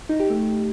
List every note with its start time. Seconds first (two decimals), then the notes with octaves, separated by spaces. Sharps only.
0.09 D#4
0.20 G4
0.30 A3